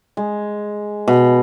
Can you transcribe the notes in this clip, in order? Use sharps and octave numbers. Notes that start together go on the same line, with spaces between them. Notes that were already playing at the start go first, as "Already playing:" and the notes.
G#3
B2